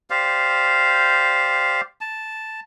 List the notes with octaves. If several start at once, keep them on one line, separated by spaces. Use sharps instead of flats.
G4 C5 D5 F5
A5